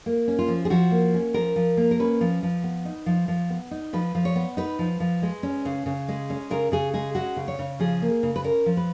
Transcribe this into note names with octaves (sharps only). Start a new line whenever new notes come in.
A#3
C#4
F4
F3
G#4
F3 F#4
A#3
C#4
F3 A#4
F3
A#3
A#4
C#4 B4
F3
F3
B3
D#4
F3
F3
B3
D#4
F3 B4
F3
C#5
B3
D#4 B4
F3
F3
G#3
C#4
C#3
C#3
G#3
C#4
C#3 A#4
C#3 G#4
G#3 G#4
C#4 F#4
C#3
C#5
C#3
F3 G#4
A#3
C#3
B4
C#4 A#4
F3
B4